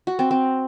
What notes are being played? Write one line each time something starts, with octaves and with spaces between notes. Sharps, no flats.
F#4
C4
C4